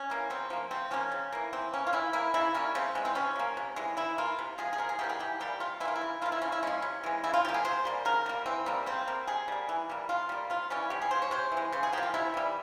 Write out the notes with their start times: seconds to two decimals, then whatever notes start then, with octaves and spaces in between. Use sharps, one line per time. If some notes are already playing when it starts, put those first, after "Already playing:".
Already playing: C#4
0.10 E3 A#3
0.30 C3 C4
0.50 F3 A#3
0.71 C#3 C4
0.91 F3 A#3 C#4
1.12 C#3
1.32 E3 A#3
1.53 E3 C4
1.73 A#3 C#4
1.87 F4
1.93 E3 E4
2.13 A#3 E4
2.34 C#3 E4
2.54 G3 A#3 C#4
2.75 C#3 C4
2.95 E3 G#3
3.05 C4
3.15 C3 C#4
3.36 F3 A#3
3.57 C3
3.76 E3 G#3
3.97 E3 E4
4.18 A#3 F4
4.39 C3
4.58 F3 G#3 G#4
4.73 G#4
4.78 C3 A#4
4.89 G#4
4.99 E3 G3 A#3 G4
5.09 G#4
5.19 E3 G4
5.40 G3 A#3 G4
5.60 C3 F4
5.80 E3 E4
5.85 A#3 F4
5.96 E4
6.01 C#3
6.22 F3 A#3 F4
6.32 E4
6.42 C#3 C#4
6.52 E4
6.63 F3 G#3 C#4
6.82 C3
7.04 E3 G#3
7.24 C#3 E4
7.33 F4
7.45 F3 A#3 G4
7.54 G#4
7.65 C3 C5
7.85 G3 A#3
8.05 C#3 A#4
8.26 G3 A#3
8.46 E3 C4
8.66 G3 A#3
8.86 C#3 C4
9.07 G3 A#3
9.27 C3 G#4
9.48 G3 A#3
9.69 E3
9.90 G3 A#3
10.09 C3 F4
10.29 G3 A#3
10.50 C3 F4
10.70 E3 G3 C#4
10.90 C3 G4
11.02 G#4
11.11 F3 G#3 C5
11.22 C#5
11.31 C3 C5
11.52 E3
11.57 G#3
11.72 C#3 C5
11.83 G#4
11.92 A#3 G4
11.98 F3
12.03 F4
12.14 C3 E4
12.34 E3 G3